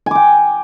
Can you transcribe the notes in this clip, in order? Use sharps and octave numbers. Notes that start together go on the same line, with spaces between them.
G5 G#5 D6